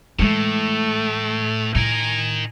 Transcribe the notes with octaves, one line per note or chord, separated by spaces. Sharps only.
A2 E3 G#3 A3
A2 D#4 A#4 G#5